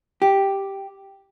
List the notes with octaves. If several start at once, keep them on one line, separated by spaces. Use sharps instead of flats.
G4